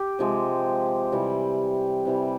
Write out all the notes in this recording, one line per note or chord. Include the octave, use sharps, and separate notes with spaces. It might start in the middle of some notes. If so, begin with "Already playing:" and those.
Already playing: G4
C3 F3 G#3
C3 E3 G3
C3 E3 G3